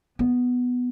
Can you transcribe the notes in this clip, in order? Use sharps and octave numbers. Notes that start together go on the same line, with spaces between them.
B3